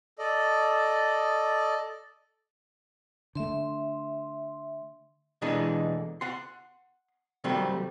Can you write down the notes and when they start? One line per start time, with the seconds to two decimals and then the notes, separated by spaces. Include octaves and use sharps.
0.19 A4 D5 D#5
3.35 D3 A3 E5 C6
5.42 B2 D3 E3 G#3 D4 D#4
6.21 F#5 C6
7.44 C3 D#3 F#3 G3 A3 C4